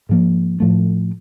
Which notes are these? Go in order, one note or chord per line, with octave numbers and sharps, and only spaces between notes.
G#2 F3 A#3
A2 F3 A3